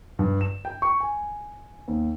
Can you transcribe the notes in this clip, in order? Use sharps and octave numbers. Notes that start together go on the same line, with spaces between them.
G2
E7
G5
C#6
G#5
D#2